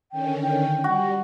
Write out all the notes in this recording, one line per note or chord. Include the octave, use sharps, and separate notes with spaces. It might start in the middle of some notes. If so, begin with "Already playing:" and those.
D3 D#3 C#4 G5
G5
G3 F#4